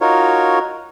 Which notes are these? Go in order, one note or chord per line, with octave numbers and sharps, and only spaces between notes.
D#4 F4 F#4 A#4 C#5